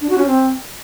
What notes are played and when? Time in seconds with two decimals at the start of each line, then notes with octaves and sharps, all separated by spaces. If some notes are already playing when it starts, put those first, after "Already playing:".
0.01 D4
0.09 F#4
0.18 C#4
0.27 C4